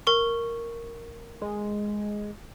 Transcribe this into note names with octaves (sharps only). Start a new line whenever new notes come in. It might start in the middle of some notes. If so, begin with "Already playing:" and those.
A#4 C#6
G#3